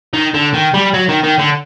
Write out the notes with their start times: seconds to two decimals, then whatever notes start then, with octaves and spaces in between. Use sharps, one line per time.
0.13 D#3
0.34 D3
0.54 D#3
0.74 G3
0.94 F#3
1.09 D#3
1.24 D#3
1.39 D3